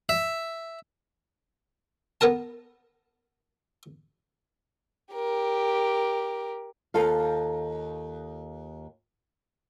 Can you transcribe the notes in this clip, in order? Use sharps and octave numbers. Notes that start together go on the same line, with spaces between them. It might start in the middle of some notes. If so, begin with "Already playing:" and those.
E5
B3 A4 A#4 A5
G4 A#4
D#2 F4 A4 F5